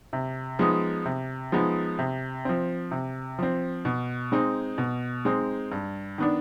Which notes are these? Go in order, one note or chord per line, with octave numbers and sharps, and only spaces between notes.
C3
F3 G#3 B3 D#4
C3
F3 G#3 B3 D#4
C3
F3 C4
C3
F3 C4
B2
G#3 C4 D#4
B2
G#3 C4 D#4
G2
D#3 B3 D4